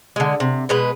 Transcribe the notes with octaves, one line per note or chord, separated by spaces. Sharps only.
D3 G#3
C3
B2 G#3 B4